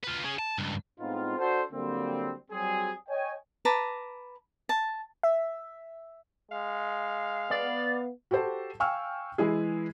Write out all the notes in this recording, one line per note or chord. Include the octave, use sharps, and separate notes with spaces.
F4 B4
C#4 G#4
A5
C#2 G2
A2 G#3 B3 C4 D#4 F4
D4 F#4 A4 C5
D3 F#3 G3 A#3 C4
F#3 G3 C4 G#4
C#5 D#5 G5 G#5
B4 A5 A#5 D6
A5
E5
G#3 F5
B3 D5
F#4 G4 A4 C5 A5
F5 G5 G#5 C#6 E6 F6
E3 G#3 E4 G#4